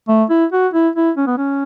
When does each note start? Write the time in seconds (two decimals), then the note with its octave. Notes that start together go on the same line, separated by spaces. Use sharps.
0.08 A3
0.30 E4
0.52 F#4
0.73 E4
0.95 E4
1.17 C#4
1.27 B3
1.37 C#4